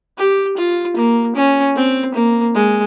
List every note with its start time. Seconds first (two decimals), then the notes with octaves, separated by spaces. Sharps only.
0.18 G4
0.58 F4
0.97 A#3
1.36 C#4
1.76 C4
2.15 A#3
2.55 G#3